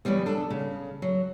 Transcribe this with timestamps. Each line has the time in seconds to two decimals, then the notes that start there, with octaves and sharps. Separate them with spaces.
0.05 E2 C#3 F#3 G3 B3
0.26 D4 A4
0.50 C#3
1.02 F#3